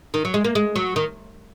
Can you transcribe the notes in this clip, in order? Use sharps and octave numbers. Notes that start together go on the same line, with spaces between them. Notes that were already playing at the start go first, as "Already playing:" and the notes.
D#3
F#3
G#3
A#3
G#3
F#3
D#3